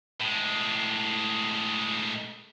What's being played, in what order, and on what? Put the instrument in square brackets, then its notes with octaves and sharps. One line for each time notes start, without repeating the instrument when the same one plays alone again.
[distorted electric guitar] A2 G#3